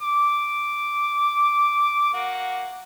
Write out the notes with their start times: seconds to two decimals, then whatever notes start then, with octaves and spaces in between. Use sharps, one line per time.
0.02 D6
2.14 A#3 F#4